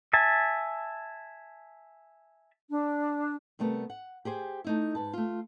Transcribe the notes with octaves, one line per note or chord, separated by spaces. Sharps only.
E5 G#5 A5
D4
C3 G3 A3 B3 A#4
F#5
G4 G#4 C5 G#5
A3 D#4 E4
G#2 B4 A5
A3 F4